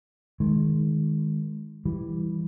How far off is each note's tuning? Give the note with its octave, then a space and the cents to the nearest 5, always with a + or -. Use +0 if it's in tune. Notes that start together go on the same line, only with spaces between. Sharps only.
D#3 +0 G#3 +10
E3 +0 G3 +0